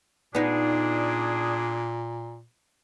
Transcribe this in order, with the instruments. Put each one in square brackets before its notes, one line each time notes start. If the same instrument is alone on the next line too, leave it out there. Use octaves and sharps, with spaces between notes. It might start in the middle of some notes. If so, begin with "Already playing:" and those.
[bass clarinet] A#2 [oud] B3 D#4 [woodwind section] D4 G#4